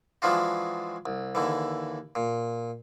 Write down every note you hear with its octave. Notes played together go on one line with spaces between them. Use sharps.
E3 F3 G#3 D4 F4 F#4
C2
D#2 D3 E3
A#2